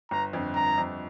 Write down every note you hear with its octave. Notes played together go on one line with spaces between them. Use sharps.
G1 A#5
F2 D3
G1 A#5
F2 D3